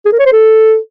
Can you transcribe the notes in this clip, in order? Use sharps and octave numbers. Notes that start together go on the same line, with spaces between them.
G#4
A#4
C#5
C5
A4